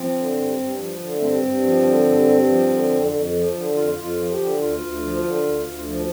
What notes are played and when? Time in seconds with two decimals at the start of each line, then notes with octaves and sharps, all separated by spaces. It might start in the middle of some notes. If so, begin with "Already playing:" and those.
Already playing: F3 C4
0.15 D3
0.36 G2
0.57 G2
0.79 F3
1.00 D3
1.14 A3
1.20 G2 C4
1.42 G2
1.63 F3
1.84 D3
2.05 G2
2.27 G2
2.48 F3
2.68 D3
2.89 F2
3.11 F2
3.32 F3
3.53 D3
3.74 F2 F4
3.95 F2
4.02 F4
4.17 F3
4.31 G4
4.37 D3
4.59 D2 F4
4.80 D2
5.01 F3
5.22 D3
5.43 D2
5.64 D2
5.86 F3